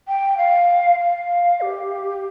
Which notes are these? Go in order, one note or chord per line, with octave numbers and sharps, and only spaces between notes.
G5
F5
F5
G4